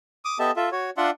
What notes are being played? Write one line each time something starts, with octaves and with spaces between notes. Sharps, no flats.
D6 D#6
B3 G4 A4 D#5 E5 A5
F4 A4 E5
F#4 C#5
D4 F4 D5 E5 F#5 C6